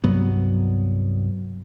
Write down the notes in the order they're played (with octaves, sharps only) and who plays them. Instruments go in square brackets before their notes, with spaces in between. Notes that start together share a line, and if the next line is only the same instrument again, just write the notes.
[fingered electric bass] C2 G2 F#3 B3